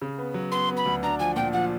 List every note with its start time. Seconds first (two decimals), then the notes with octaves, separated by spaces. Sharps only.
0.02 C#3
0.18 B3
0.34 F#3
0.52 B3 C6
0.69 B3
0.77 B5
0.86 D2
1.03 D4 A#5
1.20 F3 G#5
1.36 A#2 G5
1.53 F3 F#5